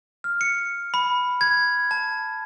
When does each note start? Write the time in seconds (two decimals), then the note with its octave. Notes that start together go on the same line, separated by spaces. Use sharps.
0.24 F6
0.41 C#7
0.94 B5
1.41 G#6
1.91 A5